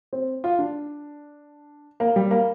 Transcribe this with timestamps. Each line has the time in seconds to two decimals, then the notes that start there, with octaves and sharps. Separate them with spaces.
0.13 C4
0.44 F4
0.59 D4
2.00 A#3
2.16 G3
2.31 A#3